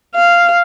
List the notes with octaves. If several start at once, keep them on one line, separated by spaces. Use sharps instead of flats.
F5